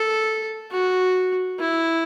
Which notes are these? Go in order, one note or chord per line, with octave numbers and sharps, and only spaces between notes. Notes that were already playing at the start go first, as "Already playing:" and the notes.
Already playing: A4
F#4
E4